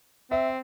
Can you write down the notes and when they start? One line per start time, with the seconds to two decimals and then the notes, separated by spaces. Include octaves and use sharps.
0.31 C4 E5